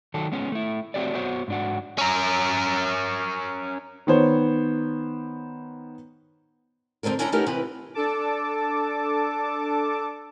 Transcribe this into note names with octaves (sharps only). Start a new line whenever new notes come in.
D#3 F#3 A4
G#3 B3 C#4
A3 E4
A3 C4 F#4 G4 C#5 D5
B3 F#4 C5 C#5
G#2 D4 F#4
C#4 A#4
D#3 B3 C5 C#5
F2 D3 C4 D4 A#4
C#4 D4 E4 D#5 G5 A#5
A3 B3 C#4 D#4 G4 A#4
C3 E3 B3 B4
D4 A4 A5 D6